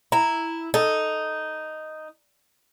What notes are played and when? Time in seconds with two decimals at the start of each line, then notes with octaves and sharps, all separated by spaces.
0.12 E4 A#5
0.74 D#4 A4